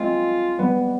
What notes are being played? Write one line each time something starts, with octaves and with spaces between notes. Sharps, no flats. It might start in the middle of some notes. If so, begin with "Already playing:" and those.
Already playing: G#3 C4 F4
G3 B3